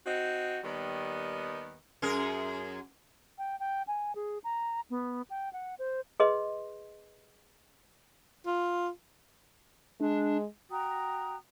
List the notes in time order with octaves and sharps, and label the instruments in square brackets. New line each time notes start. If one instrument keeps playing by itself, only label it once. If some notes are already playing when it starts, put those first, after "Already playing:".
[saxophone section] C4 D#4 F#4
D#2 D#3 G3 B3
[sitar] F#2 G#4 A#4
[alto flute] G5
G5
G#5
G#4
A#5
B3
G5
F#5
C5
[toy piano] G#4 B4 D#5 C6
[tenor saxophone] F4
[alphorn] G#3 [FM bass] D4
[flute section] F#4 G5 A#5 D#6